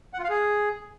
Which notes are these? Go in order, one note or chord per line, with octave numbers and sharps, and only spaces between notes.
F#5
F4
F5
G#4